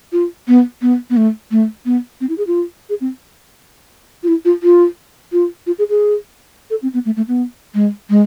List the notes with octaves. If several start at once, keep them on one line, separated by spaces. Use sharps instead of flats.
F4
B3
B3
B3
A3
A3
B3
C4
E4
G#4
F4
G#4
C4
F4
E4
F4
F4
F4
F4
G#4
G#4
A4
C4
B3
A3
A3
B3
G#3
G#3